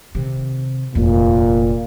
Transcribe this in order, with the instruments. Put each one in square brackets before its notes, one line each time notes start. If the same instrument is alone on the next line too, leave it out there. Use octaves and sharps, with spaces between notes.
[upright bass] C3 D#3
[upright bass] F1 D#2 [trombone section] A#2